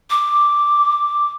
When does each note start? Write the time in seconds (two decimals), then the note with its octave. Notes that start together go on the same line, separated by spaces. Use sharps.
0.10 D6